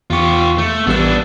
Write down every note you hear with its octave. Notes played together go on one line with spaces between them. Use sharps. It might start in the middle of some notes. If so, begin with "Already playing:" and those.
E2 F4 G4 C#6
A3
A1 G3 B3 D4 E6